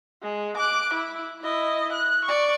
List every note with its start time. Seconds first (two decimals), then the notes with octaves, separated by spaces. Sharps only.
0.23 G#3
0.57 D6 F#6
0.94 E4
1.42 E4 D#5
1.93 F#6
2.25 D5 C#6